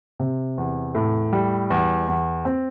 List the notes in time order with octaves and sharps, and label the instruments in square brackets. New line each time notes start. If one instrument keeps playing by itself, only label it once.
[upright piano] C3
E2
A2
G3
E2
E2
C4